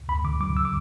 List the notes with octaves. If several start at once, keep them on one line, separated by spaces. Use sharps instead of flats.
D2 B5
D3 D6
F#3 D6
E6
D6